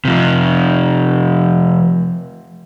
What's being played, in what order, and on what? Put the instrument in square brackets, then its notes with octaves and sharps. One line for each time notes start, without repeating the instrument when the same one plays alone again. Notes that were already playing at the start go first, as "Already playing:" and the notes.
[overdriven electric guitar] C3 F3